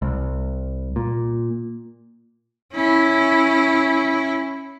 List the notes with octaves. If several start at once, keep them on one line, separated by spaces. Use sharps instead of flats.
C2
A#2
C#4 E4